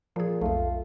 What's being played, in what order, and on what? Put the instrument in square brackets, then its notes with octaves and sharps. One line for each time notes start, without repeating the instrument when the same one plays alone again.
[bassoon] A#2 [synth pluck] F3 G#4
[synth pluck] B1 F2 [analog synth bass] A3 [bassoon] F4